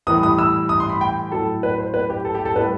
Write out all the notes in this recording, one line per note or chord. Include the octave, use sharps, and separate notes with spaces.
A2 E3 G3 D#6
D#6
E6
D#6
C6
B5
G5
A2 F#3 A4
B4
C5
B4
G4
A4
G4
A4
A2 G3 B4